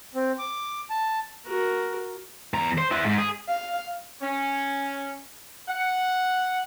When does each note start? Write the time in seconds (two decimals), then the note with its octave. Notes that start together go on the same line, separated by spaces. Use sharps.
0.15 C4
0.39 D6
0.90 A5
1.47 F#4 A#4
2.54 E2 A#5
2.78 C5
2.91 E4 F#5
3.04 G#2
3.18 G#4
3.48 F5
4.21 C#4
5.68 F#5